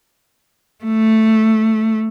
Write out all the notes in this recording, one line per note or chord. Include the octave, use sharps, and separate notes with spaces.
A3